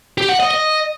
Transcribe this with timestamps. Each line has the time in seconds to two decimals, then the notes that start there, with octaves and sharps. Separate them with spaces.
0.18 G4
0.29 F#5
0.40 D#5
0.51 D#5